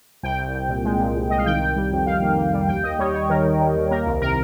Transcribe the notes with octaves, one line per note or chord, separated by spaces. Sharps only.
C2 G5
C2
C2
A#2
G#3
A#2
C2
C2 D#5
F5
D#3 G5
D#3
G3
F2
D#3 F5
A#3
A#3
G3
D#2 G5
D#2 D#5
G3 C#5
G3 C#5
D#3 A#4
D#3
G3
D#2
A#3 A#4
C2
C3 A#4